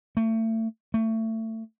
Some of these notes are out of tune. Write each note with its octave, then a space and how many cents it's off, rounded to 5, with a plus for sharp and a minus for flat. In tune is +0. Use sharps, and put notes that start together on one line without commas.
A3 +30
A3 +25